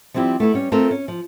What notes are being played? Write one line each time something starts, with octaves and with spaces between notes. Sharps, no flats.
F3 G3 C4 E4 G4
A3 B3 E4
G3 C#4
A3 C4 F4 A4 A#4 C5
C#4
F3